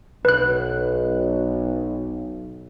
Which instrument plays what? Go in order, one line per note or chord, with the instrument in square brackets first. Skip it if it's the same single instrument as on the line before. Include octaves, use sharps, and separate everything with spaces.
[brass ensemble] B1 [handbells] B4 F#6